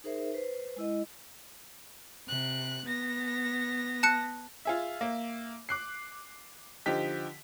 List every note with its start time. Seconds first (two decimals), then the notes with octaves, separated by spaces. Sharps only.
0.04 D#4 G#4 A#4 C5 E5
0.34 B4 C5
0.76 G#3 E4 D#5
2.27 C3 F#6
2.86 B3 A#6
4.03 A5 F#6 C#7
4.65 F4 G#4 E5
5.01 A#3 E5
5.69 D6 F#6 C7
6.86 D3 F3 D#4 G4 B6